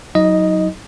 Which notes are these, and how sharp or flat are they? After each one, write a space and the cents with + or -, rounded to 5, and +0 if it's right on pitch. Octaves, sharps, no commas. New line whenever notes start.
F#3 +0 D#4 +30 D#5 +0